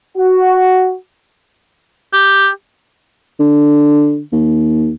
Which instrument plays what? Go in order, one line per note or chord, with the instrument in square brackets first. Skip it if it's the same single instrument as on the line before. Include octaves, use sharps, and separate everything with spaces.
[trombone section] F#4
[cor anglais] G4
[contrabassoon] D3
D#2